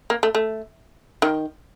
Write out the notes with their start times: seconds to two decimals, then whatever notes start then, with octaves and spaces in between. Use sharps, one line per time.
0.10 A#3
0.23 A3
0.35 A3
1.22 D#3